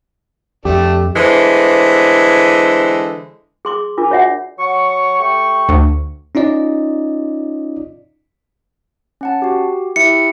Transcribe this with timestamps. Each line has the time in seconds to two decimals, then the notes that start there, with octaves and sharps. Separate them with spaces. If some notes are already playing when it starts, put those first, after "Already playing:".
0.65 F2 A3 D4 G4
1.16 D3 E3 G#3 C5
3.65 G#4 C6 D6
3.97 D4 F4 A#4 D6
4.11 F#4 C#5 D5 E5 F#5
4.59 F#3 F#5 C#6
5.19 A3 G4 C#6
5.69 D2
6.35 C#4 D#4 F4 D5 D#5
9.21 C#4 F#5 A5
9.42 F#4 G4
9.96 E4 G4 E5 C#7